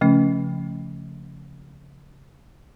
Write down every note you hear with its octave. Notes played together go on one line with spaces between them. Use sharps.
C#3 F3 A3 C#4